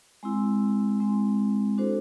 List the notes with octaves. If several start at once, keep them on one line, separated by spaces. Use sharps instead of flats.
G#3 C4 E4
G#3 C4 E4
D4 F#4 A4 C5